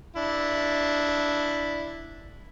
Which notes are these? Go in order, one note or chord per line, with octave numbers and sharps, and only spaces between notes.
D4 E4